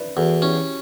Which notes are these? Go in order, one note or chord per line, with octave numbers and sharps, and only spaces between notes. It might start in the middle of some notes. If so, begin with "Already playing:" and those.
Already playing: B4 D5 E5
E2 F#4 A4
C#4 E4 G4